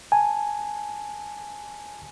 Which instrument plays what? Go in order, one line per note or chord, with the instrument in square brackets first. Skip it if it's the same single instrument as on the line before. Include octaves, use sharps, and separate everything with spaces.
[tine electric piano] G#5 A5